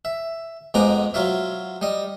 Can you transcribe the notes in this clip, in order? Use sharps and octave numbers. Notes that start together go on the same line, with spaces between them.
E5
F2 G#3 B3 A#5 D6
F#3 F4 C#5 E5
G3 D#5